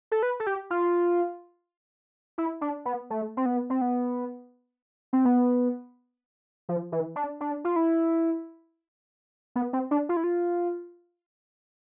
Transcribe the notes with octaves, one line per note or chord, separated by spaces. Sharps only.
A4
B4
A4
G4
F4
E4
D4
B3
A3
C4
B3
C4
B3
C4
B3
F3
E3
D4
D4
F4
E4
B3
C4
D4
F4
E4
F4